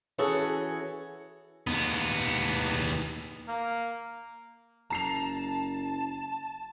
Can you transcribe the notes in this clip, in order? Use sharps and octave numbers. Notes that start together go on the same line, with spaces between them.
E3 C#4 F#4 G#4 A4 C#5
D#2 B3
A#3
F#1 A5 A#5 C7 F7